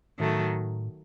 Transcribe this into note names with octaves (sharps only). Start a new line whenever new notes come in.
A2 D#3 F#3 A3